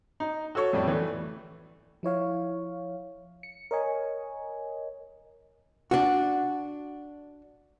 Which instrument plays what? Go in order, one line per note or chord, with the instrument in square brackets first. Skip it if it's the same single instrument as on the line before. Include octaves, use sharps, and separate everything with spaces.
[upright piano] D#4
F#4 A4 C#5 C#6
F2 A2 G3
E3 A3
[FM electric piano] F3 E4 C#5 F5
C#7
A#4 C#5 D#5 G#5
[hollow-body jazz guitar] D4 F#4